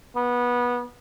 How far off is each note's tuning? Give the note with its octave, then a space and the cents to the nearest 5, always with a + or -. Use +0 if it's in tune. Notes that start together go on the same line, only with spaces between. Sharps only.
B3 -20